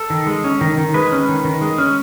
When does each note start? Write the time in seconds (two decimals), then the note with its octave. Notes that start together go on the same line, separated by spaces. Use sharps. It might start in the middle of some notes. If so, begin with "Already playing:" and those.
Already playing: A4
0.10 D#3
0.27 G#3
0.44 C#4
0.61 D#3
0.78 D#3
0.94 G#3 B4
1.12 C#4
1.29 D#3
1.45 D#3
1.61 G#3
1.78 C#4